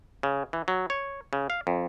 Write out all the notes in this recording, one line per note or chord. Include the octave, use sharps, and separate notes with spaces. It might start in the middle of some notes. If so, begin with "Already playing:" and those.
C#3
E3
F#3
C#5
C#3
F5
F2